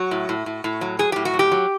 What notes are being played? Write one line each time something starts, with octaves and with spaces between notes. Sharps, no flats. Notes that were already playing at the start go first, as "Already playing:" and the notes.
Already playing: F#3 F#4
A2
A2
A2
A2
F#3
F#3 G#4
A2 G4
F#4
F#3
G4
F#3